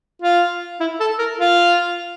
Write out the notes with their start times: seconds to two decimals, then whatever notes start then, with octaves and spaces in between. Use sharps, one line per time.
0.22 F4
0.80 E4
1.00 A4
1.19 A#4
1.39 F4